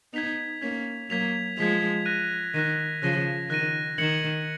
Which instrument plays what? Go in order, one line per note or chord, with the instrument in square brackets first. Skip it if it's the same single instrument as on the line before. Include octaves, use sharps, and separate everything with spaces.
[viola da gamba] B3 D#4 [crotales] G#6 B6 F7
[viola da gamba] A#3 C#4 [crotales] G#6 B6 F7
[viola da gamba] F#3 A#3 [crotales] G#6 B6 F7
[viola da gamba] F3 G#3 [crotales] G#6 B6 F7
[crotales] F#6 A#6 D#7
[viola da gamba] D#3 [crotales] F#6 A#6 D#7
[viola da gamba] C#3 F3 [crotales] F#6 A#6 D#7
[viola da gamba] D#3 [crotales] F#6 A#6 D#7
[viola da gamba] D#3 [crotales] G#6 C#7 F#7